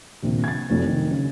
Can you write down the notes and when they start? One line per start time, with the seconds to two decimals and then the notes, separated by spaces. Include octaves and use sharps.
0.22 A#1 D#2 C3
0.44 G#6 A6
0.70 F1 C2 F#3
0.86 D#3
1.11 C#3